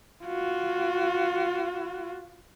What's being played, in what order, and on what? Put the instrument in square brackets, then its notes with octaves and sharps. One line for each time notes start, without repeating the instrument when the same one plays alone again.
[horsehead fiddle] F4 F#4